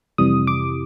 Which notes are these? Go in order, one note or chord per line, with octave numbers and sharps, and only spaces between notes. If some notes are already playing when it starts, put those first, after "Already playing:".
F2 C3 E3 G3 D#6
D6